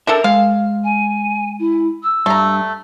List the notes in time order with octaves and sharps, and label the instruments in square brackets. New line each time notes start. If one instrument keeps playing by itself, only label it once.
[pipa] D4 A4 [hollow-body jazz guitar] A#4 E5
[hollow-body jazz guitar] G#3 [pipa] F5
[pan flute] G#5
E4
E6
[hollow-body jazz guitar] G2 [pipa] A3 A#5